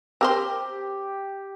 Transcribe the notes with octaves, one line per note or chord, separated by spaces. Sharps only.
C4 G4 A#4 C5